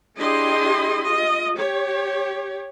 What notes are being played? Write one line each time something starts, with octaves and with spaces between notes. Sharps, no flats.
D4 E4 G4 G#4 D#5 C6
F4 D#5
G4 C#5